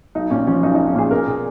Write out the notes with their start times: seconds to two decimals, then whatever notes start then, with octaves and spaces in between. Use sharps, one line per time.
0.15 B1 D#4
0.30 A#2 C#4
0.47 F3 C#4
0.63 B1 D#4
0.75 B1 D#4
0.87 C#4
0.95 A#2 G#4
1.11 B2 A#4
1.27 B2 G#4